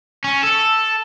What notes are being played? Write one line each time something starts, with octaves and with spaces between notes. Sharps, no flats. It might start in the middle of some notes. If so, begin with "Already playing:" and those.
C#4
A4